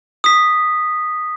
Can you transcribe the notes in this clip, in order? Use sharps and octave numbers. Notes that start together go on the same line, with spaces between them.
D#6 B6